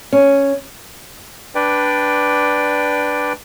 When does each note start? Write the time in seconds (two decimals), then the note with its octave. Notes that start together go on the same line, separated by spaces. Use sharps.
0.12 C#4
1.55 D4 B4 D5 G5